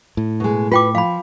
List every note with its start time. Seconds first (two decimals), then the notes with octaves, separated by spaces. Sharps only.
0.17 A2
0.40 B2 G#3
0.72 F4 B4 G5 D6
0.95 F3 F5 B5